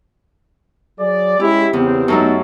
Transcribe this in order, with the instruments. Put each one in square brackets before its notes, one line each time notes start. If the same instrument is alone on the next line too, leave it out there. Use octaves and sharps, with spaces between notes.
[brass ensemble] F#3 G#4 D5
[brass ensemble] G#3 C#4 E4 [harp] G4
[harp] E2 [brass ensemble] C#3 E3 C4
[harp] F#2 F#3 A3 [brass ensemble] B3 D#4 A4